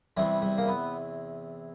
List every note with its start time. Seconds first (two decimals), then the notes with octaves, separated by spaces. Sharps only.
0.17 E2 C3 E3 G3
0.42 G3
0.58 A#3
0.68 B3